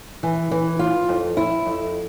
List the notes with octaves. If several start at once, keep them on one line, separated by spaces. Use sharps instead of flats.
E3
E3
F4
F2
E4
F2